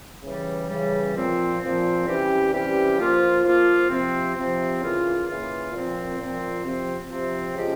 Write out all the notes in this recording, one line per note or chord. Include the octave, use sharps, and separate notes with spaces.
C#3 E3 G3
C#3 E3 G3
A#2 F3 C4
A#2 F3 C4
C3 E3 G3 C#4 G4
C3 E3 G3 C#4 G4
F3 A#3 F4
F3 A#3 F4
C3 F3 C4
C3 F3 C4
C#3 E3 A#3 F4
C#3 E3 A#3 F4
A#2 F3 C4
A#2 F3 C4
C3 F3 C4
C3 F3 C4
C#3 F3 G#3 C#4 G4